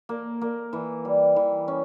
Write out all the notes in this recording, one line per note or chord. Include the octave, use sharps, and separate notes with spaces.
A#3
A#3
E3
G3
E3
C#4